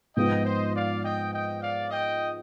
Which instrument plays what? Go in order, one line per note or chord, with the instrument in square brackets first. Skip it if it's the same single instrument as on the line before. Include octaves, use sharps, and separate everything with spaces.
[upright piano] G#2 F3 G#3 B3 F4 [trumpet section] D#5 G5
[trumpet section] C5 D#5
D5 F5
D#5 G5
D#5 G5
D5 F5
D#5 G5